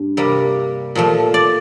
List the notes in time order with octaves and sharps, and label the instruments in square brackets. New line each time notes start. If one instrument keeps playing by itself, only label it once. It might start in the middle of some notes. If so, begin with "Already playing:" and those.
Already playing: [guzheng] G2
C3 G3 A#3
A#2 F3 A3
D5